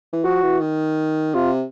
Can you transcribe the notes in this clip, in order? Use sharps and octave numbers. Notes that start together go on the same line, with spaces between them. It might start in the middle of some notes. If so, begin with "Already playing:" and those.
E3
F3 F#4
E3
D#3
C3 F4